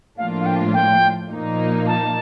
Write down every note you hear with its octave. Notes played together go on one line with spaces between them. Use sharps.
A2 F3 A#3 D4 F4 F5
F5
G5
G5
A#2 F3 A#3 D#4
A5